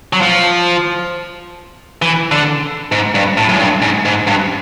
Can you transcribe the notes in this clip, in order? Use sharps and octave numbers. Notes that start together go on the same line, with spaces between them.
F#3
F3
E3
D3
G#2
G2
A2
F#2
G2
G#2
G#2
G2